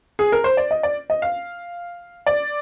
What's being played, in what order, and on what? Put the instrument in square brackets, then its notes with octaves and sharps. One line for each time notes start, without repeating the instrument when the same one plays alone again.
[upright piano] G#4
A#4
C5
D5
D#5
D5
D#5
F5
D5